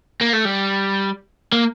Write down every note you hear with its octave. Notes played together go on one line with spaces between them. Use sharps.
A#3
A3
G3
A#3